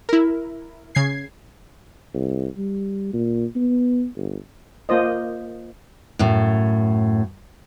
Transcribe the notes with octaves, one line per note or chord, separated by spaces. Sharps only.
E4 A#4
C#3 G#6 C7
C2
G3
A#2
B3
G1
A#3 F4 C5 D#5
F#2 A2